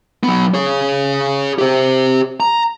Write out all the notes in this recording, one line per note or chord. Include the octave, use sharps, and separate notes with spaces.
F#3 B3
G#4 C#5
G4 C5
A#5